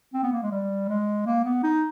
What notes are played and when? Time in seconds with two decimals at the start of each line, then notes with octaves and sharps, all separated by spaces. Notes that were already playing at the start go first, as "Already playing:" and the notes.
0.14 C4
0.23 B3
0.32 A#3
0.42 G#3
0.51 G3
0.89 G#3
1.26 A#3
1.44 B3
1.63 D#4